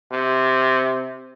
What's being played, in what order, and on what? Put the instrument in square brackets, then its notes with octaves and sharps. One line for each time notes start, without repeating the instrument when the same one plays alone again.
[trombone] C3